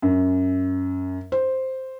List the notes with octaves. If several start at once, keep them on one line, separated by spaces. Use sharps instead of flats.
F#2
C5